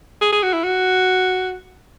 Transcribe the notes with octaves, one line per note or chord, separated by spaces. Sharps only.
G#4
G#4
F#4
E4
F#4